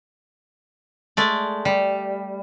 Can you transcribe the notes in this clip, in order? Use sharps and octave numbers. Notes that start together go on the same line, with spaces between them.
G#3 A3 D5
G3